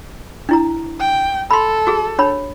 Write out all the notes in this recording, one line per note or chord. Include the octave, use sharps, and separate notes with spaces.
D4 E4 A#5
G5
A4 B5 C6
F#4 G#4
D4 C#5 B5